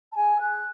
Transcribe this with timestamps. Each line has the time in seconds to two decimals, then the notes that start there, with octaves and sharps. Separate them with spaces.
0.11 A5
0.16 G#4 G#5
0.35 E6
0.40 G#4 F#6